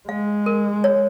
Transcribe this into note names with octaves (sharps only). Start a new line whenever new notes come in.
G#3 F5
A#4
C#5